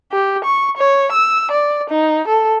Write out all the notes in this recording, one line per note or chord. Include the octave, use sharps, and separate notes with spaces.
G4
C#6
C#5
E6
D5
D#4
A4